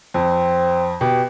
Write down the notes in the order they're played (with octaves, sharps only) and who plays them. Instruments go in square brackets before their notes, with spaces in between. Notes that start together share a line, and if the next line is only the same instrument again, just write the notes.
[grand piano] F2 [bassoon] C4
[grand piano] B2 [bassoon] G4